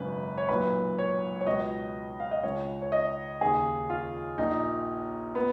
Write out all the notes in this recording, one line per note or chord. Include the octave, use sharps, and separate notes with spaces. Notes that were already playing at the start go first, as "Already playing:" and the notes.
Already playing: G#1 F#2 C#3 B4
C#5
B1 A#2 B4
C#5
C#5
C#2 B2 D#5
F5
D#5
C#2 C#3 C#5
C#5
D#5
D#2 C#3 G#4
F4
A#1 A#2 D#4
B3